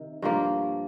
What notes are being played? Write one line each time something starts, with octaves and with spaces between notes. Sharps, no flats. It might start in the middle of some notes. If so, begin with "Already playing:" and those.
Already playing: C3 D#3
G2 F3 A#3